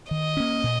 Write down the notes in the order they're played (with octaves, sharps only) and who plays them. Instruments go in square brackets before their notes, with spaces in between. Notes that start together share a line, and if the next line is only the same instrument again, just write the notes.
[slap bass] D#3 [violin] D#5
[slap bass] A#3 C#4
A#2